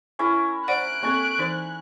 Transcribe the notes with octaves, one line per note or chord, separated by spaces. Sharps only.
C#4 E4 A#4
C5 D5 F#5 F#6 D7
A#3 C4 A4 C#5 G#5 A#5
E3 D#4 C5